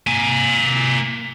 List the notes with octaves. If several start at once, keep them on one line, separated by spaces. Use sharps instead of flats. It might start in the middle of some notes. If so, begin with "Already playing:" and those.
A#3 G#5